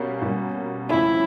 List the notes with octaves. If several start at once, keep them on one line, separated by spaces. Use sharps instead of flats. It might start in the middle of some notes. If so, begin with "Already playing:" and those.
Already playing: B2 G3 A#3 C#4
B2 G3 A#3 C#4
F2 C#3 F3 A3 C#4 E4